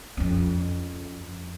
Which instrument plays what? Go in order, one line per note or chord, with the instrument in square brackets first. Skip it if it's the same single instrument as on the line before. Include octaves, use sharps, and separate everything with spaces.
[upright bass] F2 C#4